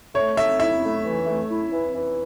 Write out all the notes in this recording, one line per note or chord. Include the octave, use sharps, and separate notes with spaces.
A3 C#5
A3 E5
E4 E5
A3
E3
A3
E4
E3
E3